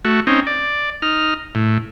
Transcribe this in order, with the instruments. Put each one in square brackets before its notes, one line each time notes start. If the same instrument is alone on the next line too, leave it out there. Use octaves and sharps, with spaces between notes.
[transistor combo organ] A3 F#4
C4 C#4 D#4
D5
D#4 F6
A2